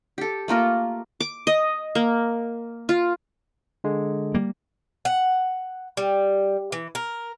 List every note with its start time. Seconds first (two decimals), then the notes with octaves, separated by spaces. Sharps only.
0.18 G4 A4
0.48 A3 A#3 F4 A#4
1.20 D6
1.47 D#5
1.95 A#3
2.89 F4
3.84 D3 G#3
4.35 G3 A#3
5.05 F#5
5.97 G3
6.72 E3
6.95 A#4